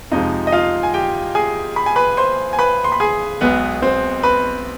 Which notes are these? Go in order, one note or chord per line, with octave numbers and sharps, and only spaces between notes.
F2 C3 F3 G#3 D#4 D#5
D#5
F4 F5
G#5
G4 G5
G#4 G#5
B5
G#5
B4 B5
C5 C6
G#5
B4 B5
C6
B5
G#4 G#5
B1 B2 G#3 B3 B4
C4 C5
B4 B5